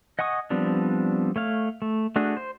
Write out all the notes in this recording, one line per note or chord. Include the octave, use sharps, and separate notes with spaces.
D#5 F#5 G#5 C#6 D#6
F3 G3 B3 C4 D4
A3 C#5 F5
A3
A3 D4 F#4 G#4
C5